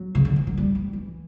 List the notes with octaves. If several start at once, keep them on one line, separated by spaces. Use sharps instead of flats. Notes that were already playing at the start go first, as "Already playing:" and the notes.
Already playing: F#3
C#3
D3
E3
F#3
G3
F#3
E3